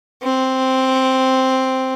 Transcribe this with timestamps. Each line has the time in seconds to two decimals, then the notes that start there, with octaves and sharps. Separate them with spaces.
0.23 C4